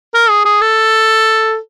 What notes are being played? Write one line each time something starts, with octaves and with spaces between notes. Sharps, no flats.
A#4
G#4
G#4
A4